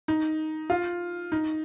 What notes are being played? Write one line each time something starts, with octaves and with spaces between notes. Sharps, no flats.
D#4
F4
D#4